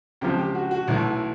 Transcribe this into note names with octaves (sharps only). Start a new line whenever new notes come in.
C#2 C3 F3 G4
G4
F#4
F#4
B1 A2 E3